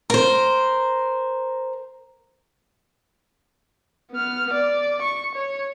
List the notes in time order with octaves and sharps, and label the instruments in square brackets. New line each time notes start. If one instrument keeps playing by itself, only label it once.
[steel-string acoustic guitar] A#4 C5
[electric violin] B3 F6
D5
C#6
C#5